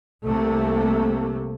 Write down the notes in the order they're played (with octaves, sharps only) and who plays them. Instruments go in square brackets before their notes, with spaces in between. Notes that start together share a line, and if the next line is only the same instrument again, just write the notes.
[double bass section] C2 C3 A3 A#3